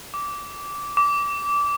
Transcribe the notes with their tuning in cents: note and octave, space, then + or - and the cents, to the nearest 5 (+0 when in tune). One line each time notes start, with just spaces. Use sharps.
D6 -15
D6 -20